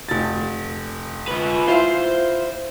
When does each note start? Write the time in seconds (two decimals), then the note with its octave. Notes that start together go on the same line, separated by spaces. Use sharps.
0.08 F1 A6
1.28 F4 B4
1.67 E4 F4 C5 F5